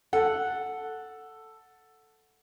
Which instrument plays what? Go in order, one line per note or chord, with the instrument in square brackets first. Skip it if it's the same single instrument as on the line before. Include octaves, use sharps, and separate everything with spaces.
[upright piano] A4 [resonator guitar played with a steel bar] F#5